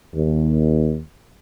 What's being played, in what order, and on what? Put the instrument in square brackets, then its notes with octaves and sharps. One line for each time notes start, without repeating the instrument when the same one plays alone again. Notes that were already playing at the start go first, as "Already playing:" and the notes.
[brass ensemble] D#2